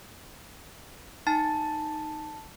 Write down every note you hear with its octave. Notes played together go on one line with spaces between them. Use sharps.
D#4 G#5 A5 A6